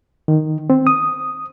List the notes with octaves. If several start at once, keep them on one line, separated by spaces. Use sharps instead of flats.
D#3
C4
D#6